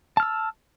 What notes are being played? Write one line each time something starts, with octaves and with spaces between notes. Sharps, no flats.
A5 E6 F6